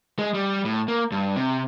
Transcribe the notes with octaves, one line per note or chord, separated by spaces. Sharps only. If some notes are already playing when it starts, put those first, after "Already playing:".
G#3
G3
A2
A#3
G2
C3